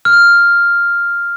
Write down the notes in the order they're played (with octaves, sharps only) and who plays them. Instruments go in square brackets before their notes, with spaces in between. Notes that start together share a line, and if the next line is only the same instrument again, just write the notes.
[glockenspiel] F6